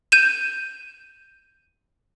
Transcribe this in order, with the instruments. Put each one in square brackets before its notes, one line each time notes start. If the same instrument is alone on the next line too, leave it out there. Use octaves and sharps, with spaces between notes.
[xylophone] G6 D#7 E7